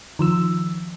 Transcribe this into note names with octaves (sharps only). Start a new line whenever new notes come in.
D#3 F3 E6